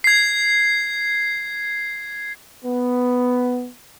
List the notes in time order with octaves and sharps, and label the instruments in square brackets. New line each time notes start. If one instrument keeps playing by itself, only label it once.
[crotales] G#6 C7
[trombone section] B3